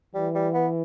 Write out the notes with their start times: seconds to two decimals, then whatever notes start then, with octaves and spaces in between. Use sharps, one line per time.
0.15 E3 G3
0.35 G3
0.54 B3